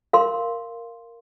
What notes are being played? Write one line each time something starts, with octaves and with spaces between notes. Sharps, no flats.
A#4 F5 C6